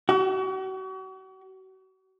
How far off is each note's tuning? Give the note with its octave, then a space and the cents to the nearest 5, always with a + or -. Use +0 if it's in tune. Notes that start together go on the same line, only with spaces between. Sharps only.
F#4 +40